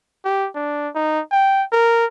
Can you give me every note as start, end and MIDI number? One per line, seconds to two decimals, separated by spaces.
0.25 0.48 67
0.55 0.88 62
0.95 1.20 63
1.32 1.63 79
1.72 2.05 70